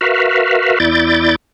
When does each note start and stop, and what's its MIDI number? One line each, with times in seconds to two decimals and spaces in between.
0.01 0.78 66
0.01 0.78 70
0.01 0.78 71
0.01 0.78 76
0.01 0.78 77
0.80 1.36 40
0.80 1.36 64
0.80 1.36 74
0.80 1.36 91
0.80 1.36 93